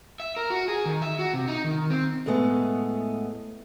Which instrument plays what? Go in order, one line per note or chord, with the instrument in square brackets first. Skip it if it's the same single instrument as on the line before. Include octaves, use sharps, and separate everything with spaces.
[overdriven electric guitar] E5
A#4
F#4
G#4
D#3
E5
F#4
C3
D#4
D#3
C4
[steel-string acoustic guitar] A2 G#3 A3 B3